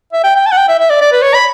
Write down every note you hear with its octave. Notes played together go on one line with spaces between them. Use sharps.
E5
G5
G5
A5
F#5
G5
E5
E5
D5
D5
B4
C#5
B5